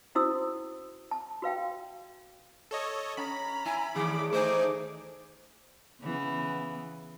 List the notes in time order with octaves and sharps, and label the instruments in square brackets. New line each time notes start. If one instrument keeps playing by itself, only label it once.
[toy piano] C#4 E4 F#4 C5 D#6 E6
A5
F#4 B4 F5 G5
[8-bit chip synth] A4 C#5 D#5
[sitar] C#4 [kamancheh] A#5 [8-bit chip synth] B5
[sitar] E4 [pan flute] G#5
[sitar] E2 A2 D#3 [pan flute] G#4 [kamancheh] D6
[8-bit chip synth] A3 D#4 G#4 [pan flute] C5 [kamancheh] D6
[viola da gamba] C#3 E3 B3